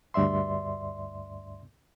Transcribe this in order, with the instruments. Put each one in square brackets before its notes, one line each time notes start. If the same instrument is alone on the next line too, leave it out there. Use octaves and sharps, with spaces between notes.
[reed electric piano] D2 G2 D5 E5 C6